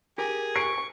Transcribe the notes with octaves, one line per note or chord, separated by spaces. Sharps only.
G4 G#4 A#4
C#6 C7 D7